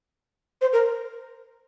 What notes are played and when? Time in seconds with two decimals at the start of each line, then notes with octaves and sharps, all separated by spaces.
0.61 C5
0.73 A#4